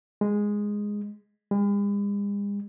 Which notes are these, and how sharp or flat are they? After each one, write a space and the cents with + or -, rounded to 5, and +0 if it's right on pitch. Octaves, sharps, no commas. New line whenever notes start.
G#3 -5
G#3 -45